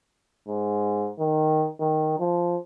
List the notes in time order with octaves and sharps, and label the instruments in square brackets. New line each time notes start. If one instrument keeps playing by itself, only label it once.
[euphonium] G#2
D#3
D#3
F3